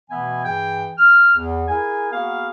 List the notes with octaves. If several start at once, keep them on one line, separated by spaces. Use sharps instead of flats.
B2 E3 A3 B3 E5 G#5
G2 E3 G#4 G5
F6
E2
E4 G#4 A#4 G#5
A#3 B3 F#4 G#4 F5